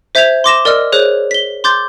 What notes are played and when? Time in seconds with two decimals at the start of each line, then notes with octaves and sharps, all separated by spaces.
0.15 C5 E5 G6 G#6 B6 F7
0.44 C6 D6 A#6 E7
0.65 A#4 D5 D#5 E6 F6
0.92 G#4 C5 C#5 F#6
1.31 B6 G7
1.64 C6 D6 G6 A6